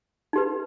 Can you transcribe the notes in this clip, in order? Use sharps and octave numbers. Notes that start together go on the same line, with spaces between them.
D#4 G4 B4